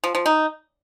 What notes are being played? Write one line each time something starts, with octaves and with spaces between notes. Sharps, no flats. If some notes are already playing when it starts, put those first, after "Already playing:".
F3
F3
D#4